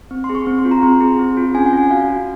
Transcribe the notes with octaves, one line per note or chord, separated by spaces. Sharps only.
C4
C6
G#4
C#6
C4
C6
F4
A#5
C4 C6
G#4
C4
F4
C#4 G#5
F#5
C#4 G#5
F#4 F5
F#4